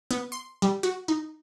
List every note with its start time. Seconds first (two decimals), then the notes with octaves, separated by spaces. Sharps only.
0.11 B3
0.32 C6
0.62 G3
0.83 F#4
1.08 D#4